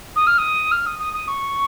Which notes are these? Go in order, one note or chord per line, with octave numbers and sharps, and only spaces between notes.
D#6
F6
D#6
F6
D#6
D#6
D#6
C#6